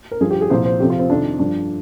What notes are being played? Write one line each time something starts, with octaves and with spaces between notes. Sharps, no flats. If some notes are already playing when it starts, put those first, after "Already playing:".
A#4
G2 F3 G#4
G4
G#4
C2 A#2 F3 C5
C5
F2 C3 F3 G4
F4
C4
F2 C3 D#3 D4
G2 F3 D4